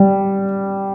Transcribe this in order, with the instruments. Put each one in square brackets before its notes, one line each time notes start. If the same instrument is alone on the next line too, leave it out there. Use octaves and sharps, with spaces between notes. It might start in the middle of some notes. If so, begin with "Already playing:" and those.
Already playing: [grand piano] G3